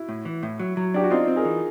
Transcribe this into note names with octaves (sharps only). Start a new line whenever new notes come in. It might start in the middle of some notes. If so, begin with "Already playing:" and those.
Already playing: E4 F#4
A2
E3
A2
F#3
F#3
D4 G4
F#4
C4 D#4 F4
C4
G#4 A#4
E3